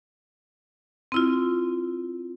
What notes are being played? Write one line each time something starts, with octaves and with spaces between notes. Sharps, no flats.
C4 E4 F4